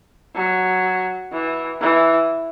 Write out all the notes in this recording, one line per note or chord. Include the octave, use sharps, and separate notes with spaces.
F#3
E3
E3